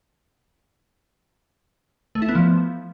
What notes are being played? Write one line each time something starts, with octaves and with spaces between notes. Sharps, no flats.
A3
E4
B3
F3